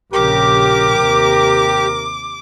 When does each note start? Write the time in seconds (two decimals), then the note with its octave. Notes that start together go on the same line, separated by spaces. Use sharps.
0.13 A#1 C#3 G4 A#4 D6
0.97 D#2 C3